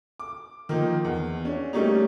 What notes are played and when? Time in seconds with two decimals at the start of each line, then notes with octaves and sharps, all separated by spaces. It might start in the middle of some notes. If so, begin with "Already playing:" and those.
0.20 D6
0.69 D#3 F3 A#3 D#4
1.04 E2
1.45 C#4 D4
1.73 G3 A3 A#3 C#4 D#4